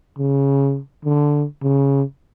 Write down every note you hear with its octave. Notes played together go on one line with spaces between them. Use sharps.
C#3
D3
C#3